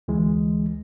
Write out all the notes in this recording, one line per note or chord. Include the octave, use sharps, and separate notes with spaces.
D2 E3 G#3